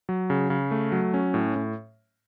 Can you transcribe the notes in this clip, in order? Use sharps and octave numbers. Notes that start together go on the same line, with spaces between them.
F#3
C#3
C#3
A3
F#3
C#4
A2
A2